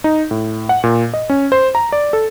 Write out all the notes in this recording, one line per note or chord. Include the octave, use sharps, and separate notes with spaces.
D#4
A2
F#5
A#2
D#5
C#4
C5
A#5
D5
A4